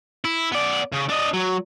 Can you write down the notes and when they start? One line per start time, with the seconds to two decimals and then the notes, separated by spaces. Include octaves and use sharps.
0.25 E4
0.52 B3 D5
0.94 C#3
1.10 D4 D#5
1.34 F#3